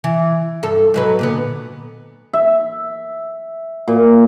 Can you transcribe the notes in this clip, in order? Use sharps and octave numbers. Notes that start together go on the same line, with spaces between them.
E3
G2 A4
G#2 F#3 B4
A#2 D3 B3
E5
A#2